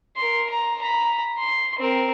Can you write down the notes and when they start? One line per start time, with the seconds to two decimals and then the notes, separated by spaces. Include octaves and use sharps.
0.17 A#4 C6
0.49 A#5
0.82 A#5 B5
1.39 C6
1.79 C4 A#4